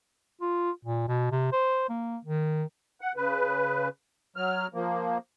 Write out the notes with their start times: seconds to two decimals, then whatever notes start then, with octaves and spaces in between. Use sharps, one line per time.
0.41 F4
0.85 A#2
1.08 B2
1.31 C3
1.52 C5
1.89 A#3
2.25 D#3
3.01 F#5
3.16 C#3 B4
4.36 F#3 F6
4.74 F3 A#3